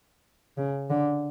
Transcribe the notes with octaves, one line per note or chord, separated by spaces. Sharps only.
C#3
D3